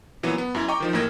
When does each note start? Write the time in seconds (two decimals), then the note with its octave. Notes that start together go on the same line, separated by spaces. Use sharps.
0.23 A#2 E3 F#3 B3
0.38 B3
0.55 F#2 E4
0.68 D#5 G5 A#5 C#6 D6
0.80 D#3 F3 D#4
0.93 A1 A2 A#3 G#6 A#6